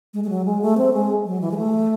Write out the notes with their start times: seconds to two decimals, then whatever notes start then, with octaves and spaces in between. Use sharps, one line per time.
0.14 G#3
0.24 G#3
0.29 F#3
0.45 G#3
0.62 A3
0.78 C4
0.94 G#3
1.25 F#3
1.41 E3
1.51 G#3
1.57 A3